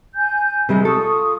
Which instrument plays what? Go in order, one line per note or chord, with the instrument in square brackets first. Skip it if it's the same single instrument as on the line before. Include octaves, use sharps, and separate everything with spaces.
[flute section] G#5 G6
[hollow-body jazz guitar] C3 G3 G#3
[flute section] F4 C#6 D#6 [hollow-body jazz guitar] A4